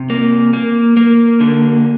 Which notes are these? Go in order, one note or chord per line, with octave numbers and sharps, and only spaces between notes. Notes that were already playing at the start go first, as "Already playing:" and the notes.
Already playing: C3
A#3
A#3
A#3
D3